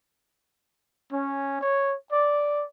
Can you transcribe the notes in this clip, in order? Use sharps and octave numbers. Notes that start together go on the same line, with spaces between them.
C#4
C#5
D5